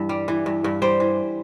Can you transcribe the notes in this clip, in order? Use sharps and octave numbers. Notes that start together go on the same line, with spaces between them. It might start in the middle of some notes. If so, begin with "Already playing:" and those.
Already playing: G2 E3
G3
E3
G2
G2
G3 C5
E3